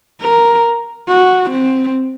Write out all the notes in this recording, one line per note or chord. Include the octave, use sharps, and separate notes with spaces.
A#4
F#4
C4